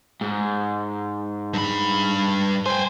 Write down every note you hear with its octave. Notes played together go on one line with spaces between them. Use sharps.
G#2
G2 B5
C5 G5 G#5